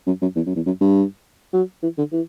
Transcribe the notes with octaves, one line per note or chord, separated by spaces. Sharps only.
F#2
F#2
E2
F#2
E2
F#2
G2
F#3
E3
D3
E3